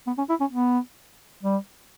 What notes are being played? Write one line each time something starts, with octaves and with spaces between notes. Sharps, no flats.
B3
C#4
E4
C#4
B3
G3